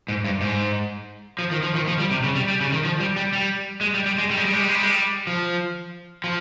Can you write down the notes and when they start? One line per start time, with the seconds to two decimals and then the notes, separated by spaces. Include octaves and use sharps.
0.08 G#2
0.25 G2
0.41 G#2
1.39 F3
1.51 D#3
1.63 F3
1.75 D#3
1.88 F3
1.99 G3
2.11 C3
2.24 C#3
2.35 G3
2.48 G3
2.61 C#3
2.72 D#3
2.85 F3
3.00 G3
3.16 G3
3.33 G3
3.81 G#3
3.94 G3
4.06 G3
4.18 G#3
4.31 G3
4.38 G#3
4.45 G3
4.53 G#3
4.60 G3
4.68 G#3
4.75 G3
4.82 G#3
4.91 G3
5.27 F3
6.24 F3